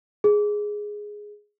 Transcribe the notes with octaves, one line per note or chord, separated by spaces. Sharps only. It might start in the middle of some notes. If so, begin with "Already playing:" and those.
G#4